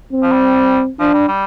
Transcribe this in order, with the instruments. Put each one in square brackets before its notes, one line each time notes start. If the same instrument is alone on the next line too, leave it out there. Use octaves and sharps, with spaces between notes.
[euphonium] C4
[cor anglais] F3
G3
[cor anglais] F3 [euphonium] D4
[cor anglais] G3
G3